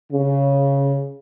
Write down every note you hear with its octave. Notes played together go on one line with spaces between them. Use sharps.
C#3